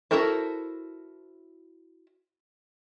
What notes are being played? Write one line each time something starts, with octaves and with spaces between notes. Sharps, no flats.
E4 F#4 A4 A#4 C5